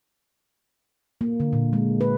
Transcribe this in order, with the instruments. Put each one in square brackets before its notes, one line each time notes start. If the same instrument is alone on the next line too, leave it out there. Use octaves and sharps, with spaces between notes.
[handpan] A#3
D3
A#2
G#3
B4